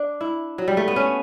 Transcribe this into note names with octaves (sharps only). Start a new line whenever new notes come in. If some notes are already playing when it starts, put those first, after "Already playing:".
Already playing: D4
E4
F#3
G3
A3
B3
C#4